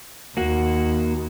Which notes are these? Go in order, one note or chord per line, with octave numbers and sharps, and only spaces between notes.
D#2 A#3 F#4